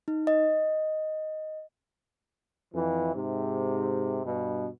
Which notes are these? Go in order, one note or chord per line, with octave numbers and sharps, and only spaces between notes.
D#4
D#5
F2 E3
G#2 C3
G2 B2